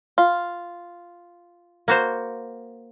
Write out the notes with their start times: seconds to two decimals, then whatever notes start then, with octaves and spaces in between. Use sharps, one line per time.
0.18 F4
1.88 A#3 F#4 C5